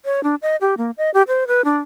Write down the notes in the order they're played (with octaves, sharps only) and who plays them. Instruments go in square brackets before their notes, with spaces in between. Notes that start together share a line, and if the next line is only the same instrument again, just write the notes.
[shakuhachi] C#5
D4
D#5
G4
A#3
D#5
G4
C5
B4
D4